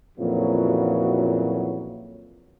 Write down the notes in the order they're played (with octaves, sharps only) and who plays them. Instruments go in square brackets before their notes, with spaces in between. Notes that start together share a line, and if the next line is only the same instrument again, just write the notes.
[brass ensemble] F2 A#2 C#3 E3 F#3